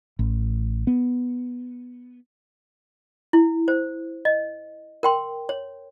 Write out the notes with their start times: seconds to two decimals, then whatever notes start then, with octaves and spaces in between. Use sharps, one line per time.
0.19 A1
0.87 B3
3.33 E4
3.68 C5
4.25 D#5
5.03 A#4 G5 C6
5.49 C#5